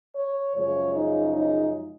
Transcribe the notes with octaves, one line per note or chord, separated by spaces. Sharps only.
C#5
F#2 C#3 F3 G#3 C#5
D#4
D#4